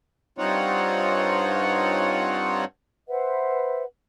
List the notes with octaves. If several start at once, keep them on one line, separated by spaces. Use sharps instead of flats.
G2 C4 D#4 F4 C#5 F#5
B4 C5 E5 F#5